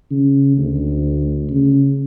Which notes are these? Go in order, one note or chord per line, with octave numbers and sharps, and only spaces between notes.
C#3
D2
C#3